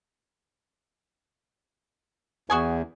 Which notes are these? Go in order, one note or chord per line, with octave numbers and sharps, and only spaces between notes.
E2 F#4 G#4 G#5